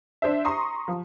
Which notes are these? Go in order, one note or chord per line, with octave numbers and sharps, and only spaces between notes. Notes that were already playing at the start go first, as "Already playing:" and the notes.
D4 C5 E5
A#5 C6 C#6 D#6
F3